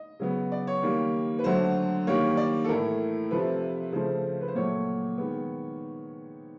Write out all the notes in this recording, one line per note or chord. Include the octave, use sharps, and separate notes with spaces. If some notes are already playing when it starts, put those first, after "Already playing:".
Already playing: D#5
C#3 F#3 B3
D5
C#5
D#3 G3 A#3
B4
D3 F#3 A3 C5
D#3 G3 A#3 C#5
D5
A4
A2 E3 A3 A#4
C3 F3 A3 B4
C#3 F3 A3 C5
B4
C5
A#2 F#3 A3 C#5
D#3 G#3 B3